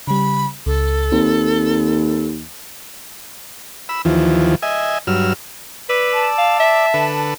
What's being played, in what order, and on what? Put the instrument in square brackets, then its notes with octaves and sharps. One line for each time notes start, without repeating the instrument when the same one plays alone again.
[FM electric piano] C#3 G3 [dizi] B5
[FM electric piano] C#2 [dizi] A4
[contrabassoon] D#2 [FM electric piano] C4
[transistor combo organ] B5 E6
D#2 E3 F3
D#5 E5 G#5
G2 F#3 E6 F6
[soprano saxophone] B4 [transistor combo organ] D5 E6
[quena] A5
[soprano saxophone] F5
E5
[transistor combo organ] D3 A4 B4